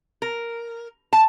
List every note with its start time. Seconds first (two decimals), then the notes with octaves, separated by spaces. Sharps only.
0.22 A#4
1.13 A5